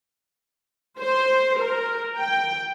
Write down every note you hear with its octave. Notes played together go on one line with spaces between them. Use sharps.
C5
A#4
G5